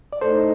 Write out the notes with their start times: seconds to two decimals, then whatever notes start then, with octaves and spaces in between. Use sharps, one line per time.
0.13 D5
0.21 A2 A3 D#4 A4 C5